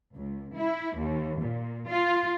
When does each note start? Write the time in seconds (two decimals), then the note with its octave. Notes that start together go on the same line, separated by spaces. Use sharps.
0.14 C#2
0.55 E4
0.98 D#2
1.40 A#2
1.88 F4